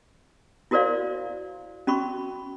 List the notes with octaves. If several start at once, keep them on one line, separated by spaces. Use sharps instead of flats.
E4 F#4 A#4 C5 D5 F5
C#4 F#4 B5 C#6